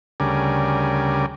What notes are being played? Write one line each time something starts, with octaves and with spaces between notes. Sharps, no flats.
D2 C#3 G3 A#4 D5 G#5